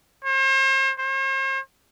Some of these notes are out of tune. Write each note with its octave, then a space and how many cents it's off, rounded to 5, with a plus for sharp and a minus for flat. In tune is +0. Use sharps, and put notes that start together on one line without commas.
C5 +40
C5 +45